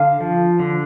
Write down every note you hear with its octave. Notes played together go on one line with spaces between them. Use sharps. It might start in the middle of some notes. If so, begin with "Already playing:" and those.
Already playing: D3 F5
F3
D3